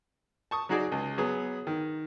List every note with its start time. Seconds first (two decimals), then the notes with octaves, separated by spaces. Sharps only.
0.51 A5 C#6 D#6
0.69 F#3 D#4 F#4 G#4 C#5 D5
0.92 C#2
1.18 F#3 B3 G#4
1.67 D#3